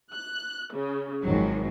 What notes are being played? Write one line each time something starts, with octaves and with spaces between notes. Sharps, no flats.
F#6
C#3
G#1 D#3 F3 F#3